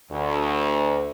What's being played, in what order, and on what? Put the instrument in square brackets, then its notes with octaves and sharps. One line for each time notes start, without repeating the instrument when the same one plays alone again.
[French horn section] D2